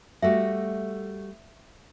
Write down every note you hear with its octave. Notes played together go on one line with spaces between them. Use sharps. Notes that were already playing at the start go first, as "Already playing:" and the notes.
G3 A3 F#4 E5